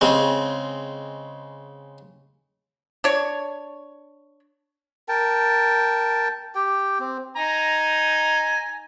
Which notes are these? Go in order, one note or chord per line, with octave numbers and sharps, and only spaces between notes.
C#3 G#3 C4
D4 C#5
A#4 G5 A5
G4 G5
C4
D#4 G#5 A#5